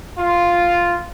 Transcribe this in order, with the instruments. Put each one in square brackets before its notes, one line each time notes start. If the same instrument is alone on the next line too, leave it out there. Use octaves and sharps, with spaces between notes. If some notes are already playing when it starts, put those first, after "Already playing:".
[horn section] F4